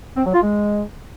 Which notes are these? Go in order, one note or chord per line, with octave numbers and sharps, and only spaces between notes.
C4
F#3
F4
G#3